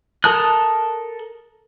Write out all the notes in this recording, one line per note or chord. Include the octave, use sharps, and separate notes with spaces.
A4 A#4 A5 D#6 F#6